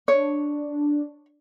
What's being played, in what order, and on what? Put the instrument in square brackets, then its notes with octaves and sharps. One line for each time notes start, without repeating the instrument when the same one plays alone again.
[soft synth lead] D4 [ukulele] C#5